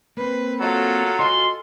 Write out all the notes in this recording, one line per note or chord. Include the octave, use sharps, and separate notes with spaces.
A#3 C4 B4
F#3 F4 A4
F#4 D#5 G#5 C6